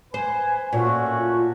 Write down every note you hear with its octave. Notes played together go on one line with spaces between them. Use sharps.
B4 C5 G#5
A#2 A3 C#4 F4 F#4